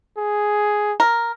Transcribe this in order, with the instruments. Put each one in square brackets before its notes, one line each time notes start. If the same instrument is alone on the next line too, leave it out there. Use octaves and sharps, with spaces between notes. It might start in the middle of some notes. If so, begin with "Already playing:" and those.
[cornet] G#4
[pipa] A#4